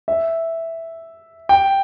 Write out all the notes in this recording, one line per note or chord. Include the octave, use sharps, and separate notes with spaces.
E5
G5